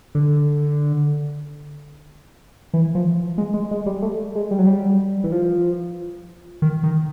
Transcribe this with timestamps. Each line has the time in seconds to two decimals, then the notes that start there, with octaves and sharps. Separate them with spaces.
0.15 D3
2.74 E3
2.95 F3
3.38 G#3
3.54 G#3
3.71 G#3
3.86 G3
4.02 A3
4.35 G#3
4.51 G3
4.59 F#3
4.67 G3
5.24 E3
5.32 F3
6.62 D#3
6.83 D#3